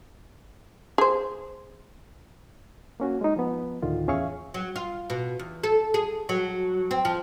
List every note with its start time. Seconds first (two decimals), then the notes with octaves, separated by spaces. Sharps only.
0.98 G#4 C5
3.00 A#3 C#4 F#4
3.21 G#3 D#4
3.36 F3 B3
3.82 D2 A2 D3 D#3 F4
4.08 E2 C#4 G#4 E5 F5 C#6
4.54 F#3
4.76 F4
5.10 B2
5.39 E2
5.63 A4
5.94 G#4
6.29 F#3
6.91 C4
7.05 F3